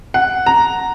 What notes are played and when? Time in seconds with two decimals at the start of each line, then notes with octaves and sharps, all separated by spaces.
0.14 F#5
0.46 A#5